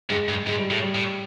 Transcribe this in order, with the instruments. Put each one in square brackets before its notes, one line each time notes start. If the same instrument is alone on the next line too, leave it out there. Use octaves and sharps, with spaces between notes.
[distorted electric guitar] G2 [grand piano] G#3
[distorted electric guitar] G2
[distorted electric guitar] G#2 [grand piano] G#3
[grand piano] G3
[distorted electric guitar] A2
[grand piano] G3
[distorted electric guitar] A2